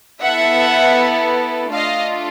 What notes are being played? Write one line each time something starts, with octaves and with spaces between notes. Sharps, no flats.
B3 E4 A4 E5 F#5
A3 D4 F4 D#5 F5